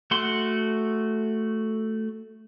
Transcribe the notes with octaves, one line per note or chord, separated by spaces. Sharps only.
A3 F#4 F#5 C6